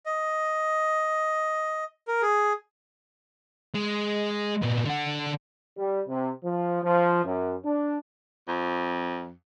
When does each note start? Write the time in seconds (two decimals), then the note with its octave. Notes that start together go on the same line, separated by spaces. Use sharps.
0.06 D#5
2.08 A#4
2.22 G#4
3.75 G#3
4.62 A#2 B3
4.85 D3 F#5
5.78 G3
6.08 C3
6.44 F3
6.83 F3
7.25 F#2
7.65 D4
8.48 F2